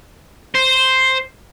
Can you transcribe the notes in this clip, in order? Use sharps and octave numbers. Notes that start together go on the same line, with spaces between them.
C5